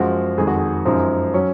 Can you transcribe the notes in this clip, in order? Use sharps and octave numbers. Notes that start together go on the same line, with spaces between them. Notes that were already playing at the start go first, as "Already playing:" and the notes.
Already playing: F#2 F3 G#3 F#4
F2 D#3 G#3 G#4
F#4
G#4
F#2 F3 G#3 D#4
F#3 C#4